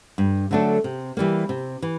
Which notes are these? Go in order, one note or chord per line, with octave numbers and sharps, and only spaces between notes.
G2
D3 F#3 A3 D4
C3
E3 G3 A#3
C3
E3